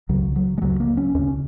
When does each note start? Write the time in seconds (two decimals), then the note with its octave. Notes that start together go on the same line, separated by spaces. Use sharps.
0.09 C#2 C#3 F#3
0.36 F#3
0.58 G#3
0.62 C#2 C#3 F#3
0.80 A#3
0.97 C#4
1.15 D#2 C#3 C#4